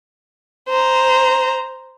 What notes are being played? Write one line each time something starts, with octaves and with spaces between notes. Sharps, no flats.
C5 A#5